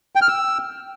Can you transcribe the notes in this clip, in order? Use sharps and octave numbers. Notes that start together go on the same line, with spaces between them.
G5
F6
E6